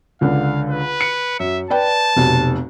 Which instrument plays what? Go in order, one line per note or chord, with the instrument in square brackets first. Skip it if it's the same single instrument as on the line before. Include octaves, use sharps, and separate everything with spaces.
[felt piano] C#2 D3 [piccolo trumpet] F5
[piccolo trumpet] B4
[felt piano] C#7
[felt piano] F#2 [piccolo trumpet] E5
[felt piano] B4 D5 G5 [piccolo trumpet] A5
[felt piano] F1 B1 C3